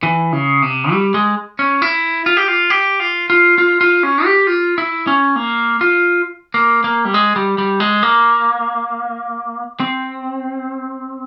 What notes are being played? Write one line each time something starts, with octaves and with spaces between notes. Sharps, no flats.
E3
C#3
C3
G3
G#3
C#4
E4
F4
G4
F4
G4
F4
F4
F4
F4
C#4
G4
F4
E4
C#4
A#3
F4
A#3
A#3
G3
G#3
G3
G3
G#3
A#3
C4